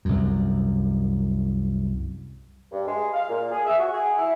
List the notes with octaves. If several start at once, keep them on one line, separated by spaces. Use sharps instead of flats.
C2 F#2
G2
G#3
F5
A#2
G#4
E5
F#4
G#4
E4